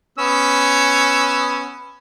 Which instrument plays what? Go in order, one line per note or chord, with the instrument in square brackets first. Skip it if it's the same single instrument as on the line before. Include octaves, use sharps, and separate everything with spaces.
[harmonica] B3 C#4 E6